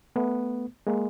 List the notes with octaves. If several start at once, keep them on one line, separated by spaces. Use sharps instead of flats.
A3 B3
G#3 A#3